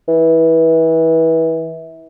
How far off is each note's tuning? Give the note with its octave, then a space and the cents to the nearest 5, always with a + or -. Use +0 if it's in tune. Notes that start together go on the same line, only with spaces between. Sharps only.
E3 -25